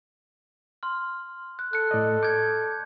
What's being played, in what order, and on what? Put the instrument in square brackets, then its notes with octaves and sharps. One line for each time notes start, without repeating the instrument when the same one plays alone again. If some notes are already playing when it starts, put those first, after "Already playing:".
[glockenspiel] C6 F6
F#6
[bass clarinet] A4 [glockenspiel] F#6 C#7
[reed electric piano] A2 D5 D#5
[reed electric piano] D6 [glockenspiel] G6 G#6